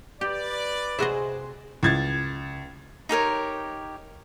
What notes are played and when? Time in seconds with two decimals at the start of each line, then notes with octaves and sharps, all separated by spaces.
0.21 G4 B4 D5
0.99 C3 E4 F#4 G#4 C5 D#5
1.83 C#2 G#6 A6
3.09 D#4 G4 A#4 C#5